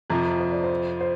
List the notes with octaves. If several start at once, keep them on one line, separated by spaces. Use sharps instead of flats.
F2 C3 F3 A#5
A#5
C5
D5
C5
C5